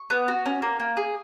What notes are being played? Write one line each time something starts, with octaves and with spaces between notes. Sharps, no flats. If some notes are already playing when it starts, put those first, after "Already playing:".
Already playing: C#6
B3
F#4
C#4
A#3
A#3
G#4